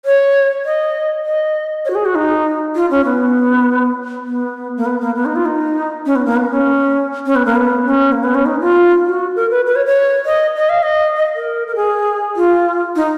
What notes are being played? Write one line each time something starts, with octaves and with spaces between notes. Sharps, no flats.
C#5
D#5
D#5
C#5
F#4
G#4
F#4
D#4
F4
C#4
B3
B3
A#3
B3
A#3
B3
D#4
F4
D#4
C#4
B3
A#3
B3
C#4
C#4
B3
A#3
B3
C#4
A#3
B3
C#4
D#4
F4
F#4
A#4
B4
B4
C#5
C#5
D#5
D#5
F5
D#5
D#5
A#4
A#4
G#4
F4
D#4